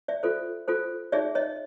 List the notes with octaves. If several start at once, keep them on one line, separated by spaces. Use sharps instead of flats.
D5 E5
F4 A4 C5
F4 A4 C5
D#4 G#4 C#5 D5 E5
C#5 D#5